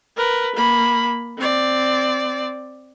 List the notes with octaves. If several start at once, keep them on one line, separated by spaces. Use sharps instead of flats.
A#4 B4
A#3 B5
C4 D5